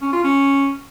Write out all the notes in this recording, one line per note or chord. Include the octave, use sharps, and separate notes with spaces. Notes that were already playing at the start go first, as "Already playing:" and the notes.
C#4
F4
C#4